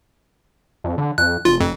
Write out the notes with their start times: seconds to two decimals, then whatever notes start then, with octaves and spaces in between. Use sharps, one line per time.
0.84 F2
0.98 D3
1.18 F2 F#6
1.45 F1 F4
1.61 F2